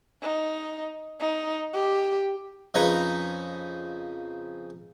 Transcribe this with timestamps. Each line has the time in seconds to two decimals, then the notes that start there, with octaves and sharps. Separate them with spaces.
0.22 D#4
1.20 D#4
1.74 G4
2.74 F2 C#3 D#4 B4 C#5 A#5